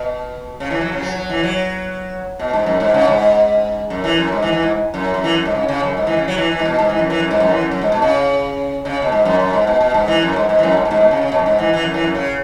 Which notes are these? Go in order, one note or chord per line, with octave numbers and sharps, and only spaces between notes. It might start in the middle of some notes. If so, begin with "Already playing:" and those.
Already playing: B2
C#3
E3
F#3
C#3
F#3
F#3
E3
F#3
B2
G#2
F#2
G#2
C#3
G#2
F#2
E3
F#2
G#2
E3
E3
G#2
F#2
F#2
E3
F#2
G#2
C#3
C#3
F#2
G#2
E3
C#3
F#3
E3
E3
G#2
B2
G#2
E3
F#2
E3
F#2
G#2
F#2
E3
F#2
F#2
G#2
B2
C#3
C#3
B2
G#2
F#2
F#2
G#2
B2
B2
G#2
E3
F#2
G#2
G#2
E3
F#2
G#2
B2
G#2
B2
C#3
C#3
B2
F#2
G#2
E3
E3
F#2
E3
F#2
C#3